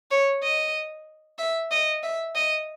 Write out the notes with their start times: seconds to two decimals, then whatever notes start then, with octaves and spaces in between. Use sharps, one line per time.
0.11 C#5
0.43 D#5
1.38 E5
1.71 D#5
2.03 E5
2.35 D#5